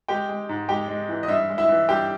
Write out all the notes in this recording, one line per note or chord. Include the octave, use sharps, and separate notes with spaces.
G#3 G4 G5
G#3
G#2
G#3 G4 G5
G#3
E3
D#5
G2 E4 E5
G#3
E4 E5
E3
G2 G4 G5